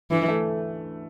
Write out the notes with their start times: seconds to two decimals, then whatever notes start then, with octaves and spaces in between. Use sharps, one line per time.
0.11 D2 E3
0.28 A3